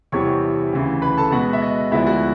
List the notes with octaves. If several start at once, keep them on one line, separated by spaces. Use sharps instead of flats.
E2 C3 E3 G3 C#5 C#6
D2 C#3 E3
B4 B5
A4 A5
B2 G#3 B3 F#4 F#5
E5
D#5
D2 D3 F3 G#3 B3 E4 E5
F#4 F#5